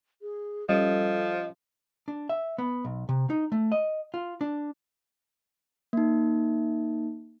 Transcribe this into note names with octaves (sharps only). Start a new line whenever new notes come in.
G#4
F3 G3 C#4 A4 D#5
D4
E5
B3
B1
C3
D#4
A3
D#5
F4
D4
A#3 D#4